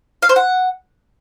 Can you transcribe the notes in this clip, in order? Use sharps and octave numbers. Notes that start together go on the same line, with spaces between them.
F5
C5
F#5